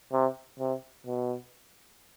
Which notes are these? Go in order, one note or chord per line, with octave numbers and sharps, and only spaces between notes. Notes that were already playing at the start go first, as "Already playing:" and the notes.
C3
C3
B2